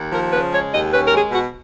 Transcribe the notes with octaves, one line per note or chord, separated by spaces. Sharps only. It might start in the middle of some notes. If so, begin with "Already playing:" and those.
Already playing: D#2
F3 A#4
C#3 B4
G#3 C#5
D#2 D#5
C#4 B4
A#4
G#3 G#4
B2 F#4